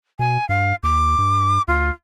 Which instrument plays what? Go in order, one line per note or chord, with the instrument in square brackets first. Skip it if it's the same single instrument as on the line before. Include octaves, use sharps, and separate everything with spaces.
[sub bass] B2 [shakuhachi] G#5
[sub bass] G2 [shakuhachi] F5
[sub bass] D#2 [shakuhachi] D6
[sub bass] G2
[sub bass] D2 [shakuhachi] F4